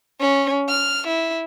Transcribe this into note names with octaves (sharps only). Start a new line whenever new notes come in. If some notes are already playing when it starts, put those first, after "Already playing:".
C#4
F6
E4